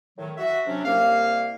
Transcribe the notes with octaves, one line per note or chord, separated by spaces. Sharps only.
A2 D#3 F#3
F#4 E5
C3 F#3 C#4 D4
C2 A#3 F5